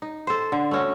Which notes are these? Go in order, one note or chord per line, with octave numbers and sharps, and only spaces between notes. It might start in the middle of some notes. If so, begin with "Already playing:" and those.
D#4
A4 C5
D3
A3 C#4 F#4